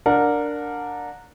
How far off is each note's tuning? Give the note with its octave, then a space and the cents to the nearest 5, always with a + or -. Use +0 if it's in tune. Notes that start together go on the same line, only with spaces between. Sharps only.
D4 +0 A#4 -10 F#5 -35